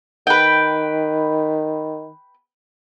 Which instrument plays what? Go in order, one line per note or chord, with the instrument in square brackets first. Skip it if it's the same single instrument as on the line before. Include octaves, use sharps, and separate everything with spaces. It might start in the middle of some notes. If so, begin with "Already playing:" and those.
[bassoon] D#3 [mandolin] B4 G5